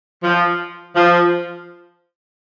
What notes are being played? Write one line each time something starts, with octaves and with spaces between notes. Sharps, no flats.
F3
F3